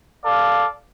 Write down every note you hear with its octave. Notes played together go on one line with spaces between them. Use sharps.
A4 D5 F5